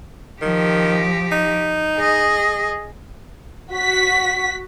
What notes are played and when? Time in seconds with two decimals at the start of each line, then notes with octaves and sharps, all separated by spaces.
0.42 D#3 F3 G4
1.32 D#4
1.98 G#4 D#5
3.71 F#4 B6